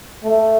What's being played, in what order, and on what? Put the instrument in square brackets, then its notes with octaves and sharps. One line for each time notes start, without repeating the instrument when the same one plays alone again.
[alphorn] A3